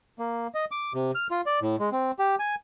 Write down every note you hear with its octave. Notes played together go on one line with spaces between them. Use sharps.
A#3
D#5
D6
C3
F6
F4
D5
A2
G#3
C4
G4
G#5